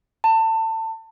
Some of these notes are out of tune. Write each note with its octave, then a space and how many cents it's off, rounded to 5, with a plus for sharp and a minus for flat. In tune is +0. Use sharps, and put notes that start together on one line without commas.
A5 +25